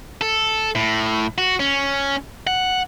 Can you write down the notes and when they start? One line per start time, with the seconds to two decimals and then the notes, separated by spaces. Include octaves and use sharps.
0.21 A4
0.75 A2
1.38 F#4
1.60 C#4
2.47 F#5